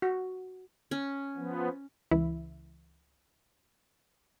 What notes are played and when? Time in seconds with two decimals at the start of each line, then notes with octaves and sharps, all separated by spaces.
0.02 F#4
0.91 C#4
1.37 F3 B3
2.11 C#2 E3 E4